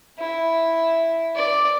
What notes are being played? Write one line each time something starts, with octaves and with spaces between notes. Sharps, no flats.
E4
D5